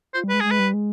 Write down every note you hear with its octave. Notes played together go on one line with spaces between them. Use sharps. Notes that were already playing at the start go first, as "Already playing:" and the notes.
F4 C5
G3
G#3 B4
G#3 G#4
B4
G3
G#3